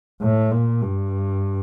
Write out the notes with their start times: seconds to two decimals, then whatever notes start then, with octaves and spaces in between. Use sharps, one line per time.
0.22 A2
0.52 A#2
0.82 G2